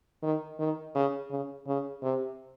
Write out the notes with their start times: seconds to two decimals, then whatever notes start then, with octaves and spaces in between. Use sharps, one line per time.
0.23 D#3
0.59 D#3
0.95 C#3
1.31 C#3
1.67 C#3
2.03 C3